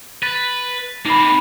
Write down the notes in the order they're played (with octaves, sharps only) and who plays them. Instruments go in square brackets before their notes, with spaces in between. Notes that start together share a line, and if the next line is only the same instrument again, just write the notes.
[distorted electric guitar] B4 [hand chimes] A6
[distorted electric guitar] A#3 C4 [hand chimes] D#4 B5